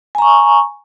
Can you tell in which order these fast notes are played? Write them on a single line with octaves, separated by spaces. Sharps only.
G#5 A#5 C#6